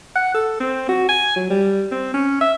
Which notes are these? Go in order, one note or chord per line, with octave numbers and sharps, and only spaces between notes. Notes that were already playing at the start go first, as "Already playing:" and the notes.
F#5
A4
C4
F#4
G#5
F#3
G3
C4
C#4
E5